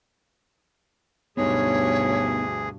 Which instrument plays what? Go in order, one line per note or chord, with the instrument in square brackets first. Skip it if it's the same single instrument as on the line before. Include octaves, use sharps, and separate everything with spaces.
[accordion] D2 G#4 [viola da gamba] G2 B2 [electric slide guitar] B3 D#4 B4 [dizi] C#5